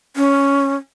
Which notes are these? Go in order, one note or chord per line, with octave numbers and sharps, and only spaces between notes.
C#4